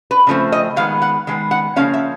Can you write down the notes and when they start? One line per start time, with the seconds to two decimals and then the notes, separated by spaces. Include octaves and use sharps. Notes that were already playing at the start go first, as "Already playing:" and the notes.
0.11 B4
0.27 C#3 F3 A3 C4
0.52 D#5
0.76 D#3 G#3 B3 F5
1.02 F#5
1.27 D#3 G#3 B3
1.51 F#5
1.76 C#3 F3 A#3 C#4 F5
1.94 E5